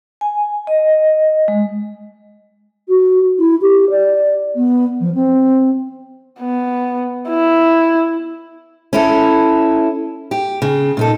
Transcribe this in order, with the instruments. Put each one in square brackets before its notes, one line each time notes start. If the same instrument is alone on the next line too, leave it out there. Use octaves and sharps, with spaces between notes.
[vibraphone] G#5
D#5
G#3
[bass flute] F#4
E4
G4
D5
B3
F3
C4
[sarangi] B3
E4
[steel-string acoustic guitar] C#4 E4 A4
G4
C#3
A#2 D#4 A4